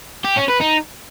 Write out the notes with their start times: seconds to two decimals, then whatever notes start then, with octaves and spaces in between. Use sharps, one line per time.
0.24 G4
0.36 C#4
0.48 B4
0.60 D#4